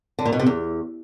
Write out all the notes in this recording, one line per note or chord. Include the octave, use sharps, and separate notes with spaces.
D3
A#2
B2
C3
E2